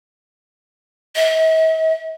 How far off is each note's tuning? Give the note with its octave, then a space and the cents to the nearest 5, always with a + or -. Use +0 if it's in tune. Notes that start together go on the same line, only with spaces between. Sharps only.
E5 -45